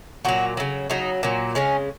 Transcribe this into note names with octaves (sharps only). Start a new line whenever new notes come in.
A#2 F#3 F#4
C#3 F#3
C#3 F#3 D#4
A#2 F#3
C#3 G#3 C#4